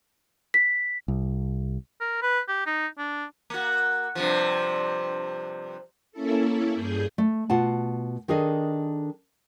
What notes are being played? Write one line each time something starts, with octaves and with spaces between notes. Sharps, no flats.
B6
C2
A#4
B4
G4
D#4
D4
A#3 F#4
G2 C3 F3
A#3 C#4 E4 A4
G2 G#4 G6
A3
B2 F4 F#5 A5
D#3 D4 G#4 A4 D#5